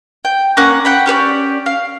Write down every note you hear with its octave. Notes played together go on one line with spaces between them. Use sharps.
G5
A#3 C#4 F#5
F#5 G5 B5
C#4 G4 C5 D5
F5